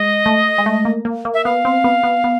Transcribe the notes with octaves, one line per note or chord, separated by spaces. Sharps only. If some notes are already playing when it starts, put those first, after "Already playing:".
Already playing: G#3 D#5
A3
G#3
A3
A#3
A#3
A#3
E5
B3 F5
C4
B3
B3
B3